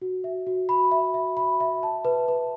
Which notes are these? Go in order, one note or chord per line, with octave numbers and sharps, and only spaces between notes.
F#4
E5
F#4
B5
E5
E5
B5
E5
A5
B4
B4